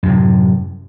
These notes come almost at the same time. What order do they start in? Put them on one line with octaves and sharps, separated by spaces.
F#2 C3 A2